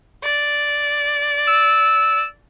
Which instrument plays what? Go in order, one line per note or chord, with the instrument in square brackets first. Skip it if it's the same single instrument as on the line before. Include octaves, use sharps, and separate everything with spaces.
[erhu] D5
[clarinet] E6